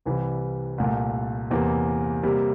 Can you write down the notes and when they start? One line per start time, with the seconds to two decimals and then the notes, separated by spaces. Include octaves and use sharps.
0.05 C2 C3 E3 G3
0.78 C2 A#2 A3
1.51 E2 C3 E3 A#3
2.23 C3 G3 A#3